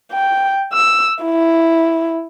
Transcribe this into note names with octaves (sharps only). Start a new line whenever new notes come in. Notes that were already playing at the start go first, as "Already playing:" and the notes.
G5
E6
E4